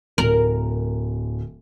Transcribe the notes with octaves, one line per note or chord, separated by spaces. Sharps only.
D1 A#4